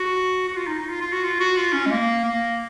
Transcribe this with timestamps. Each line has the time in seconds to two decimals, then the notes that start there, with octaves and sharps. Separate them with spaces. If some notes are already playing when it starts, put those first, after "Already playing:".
Already playing: F#4
0.48 F#4
0.56 F4
0.67 D#4
0.79 D#4
0.89 F4
1.01 F4
1.12 F#4
1.24 F4
1.40 F#4
1.57 F4
1.73 C#4
1.86 G#3
1.91 A#3
2.24 A#3